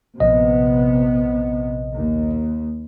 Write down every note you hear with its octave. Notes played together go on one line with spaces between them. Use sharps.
A#1 C3 B3 D#5
D#2